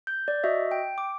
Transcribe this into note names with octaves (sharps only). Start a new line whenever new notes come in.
G6
D5
F#4 D#5 E5
G5
D6